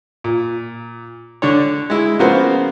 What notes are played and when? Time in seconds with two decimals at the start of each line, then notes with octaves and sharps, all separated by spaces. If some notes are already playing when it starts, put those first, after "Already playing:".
0.24 A#2
1.42 D3 D4 C#5
1.90 G#3 E4
2.19 C#3 F3 A#3 B3 F#4 C5